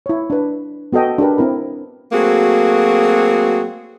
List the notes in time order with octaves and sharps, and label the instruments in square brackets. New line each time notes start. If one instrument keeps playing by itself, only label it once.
[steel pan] E4 C#5
D4 B4
B3 F#4 A4 D#5 G5
D4 G4 A#4 B4
C4 E4 A#4 B5
[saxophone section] F#3 A3 A#3 C4 F#4 G#4